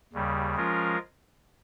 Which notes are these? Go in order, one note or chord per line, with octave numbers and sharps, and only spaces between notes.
D#2 C#3 G3
F3 G#3 C#4 F4 A#4